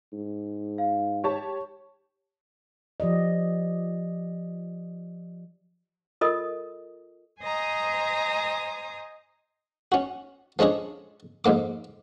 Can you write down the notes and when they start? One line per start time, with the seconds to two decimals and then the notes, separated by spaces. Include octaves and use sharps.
0.13 G#2
0.78 F5
1.24 G4 C#5 A5 C#6
3.00 F3 G4 D5 D#5
6.21 F4 A4 A#4 D#5 D#6
7.41 C5 D#5 G#5 A#5 D#6
9.92 C#4 F#4
10.59 F3 G#3 C#4 D4 G#4
11.45 F2 G#2 A#3 D6